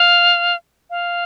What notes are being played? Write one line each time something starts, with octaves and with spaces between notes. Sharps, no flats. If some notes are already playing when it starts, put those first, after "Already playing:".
Already playing: F5
F5